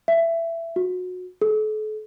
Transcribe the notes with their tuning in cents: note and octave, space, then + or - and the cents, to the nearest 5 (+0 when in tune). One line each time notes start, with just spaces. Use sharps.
E5 +15
F#4 -25
A4 -40